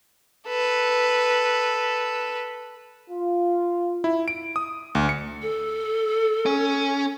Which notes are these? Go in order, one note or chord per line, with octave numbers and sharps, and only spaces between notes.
A4 B4
F4
E4
D7
D#6
D2
C#7
A4
C#4